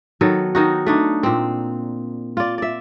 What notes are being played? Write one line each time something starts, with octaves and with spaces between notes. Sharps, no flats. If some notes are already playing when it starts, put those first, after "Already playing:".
D#3 F#3 B3 A4
D#3 D#4 F#4
A3 D4 D#4
A#2 C4
F4 D5
D5 E5